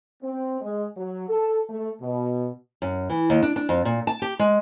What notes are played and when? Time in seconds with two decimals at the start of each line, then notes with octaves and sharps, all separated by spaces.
0.23 C4
0.60 G#3
0.96 F#3
1.29 A4
1.69 A3
2.01 B2
2.82 F#2
3.10 E3
3.30 D#2
3.43 D4
3.56 D4
3.69 F2
3.85 A#2
4.07 A5
4.22 G4
4.39 G#3